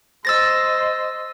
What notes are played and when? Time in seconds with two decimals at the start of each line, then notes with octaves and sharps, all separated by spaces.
0.25 C5 D#5 E6 A6 A#6